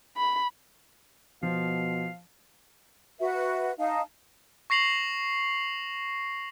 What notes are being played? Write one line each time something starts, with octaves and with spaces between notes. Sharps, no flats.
B5
B2 F3 F5
F#4 B4 E5
D#4 F5 A5
C#6 A#6 C7 F7 F#7